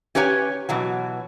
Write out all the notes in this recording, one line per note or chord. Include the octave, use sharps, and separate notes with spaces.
C#4 G4 B4 C#5 F#5 G#5
B2 E3 F#3